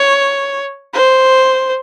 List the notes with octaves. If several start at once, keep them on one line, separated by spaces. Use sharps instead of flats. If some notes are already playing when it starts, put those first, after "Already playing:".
Already playing: C#5
C5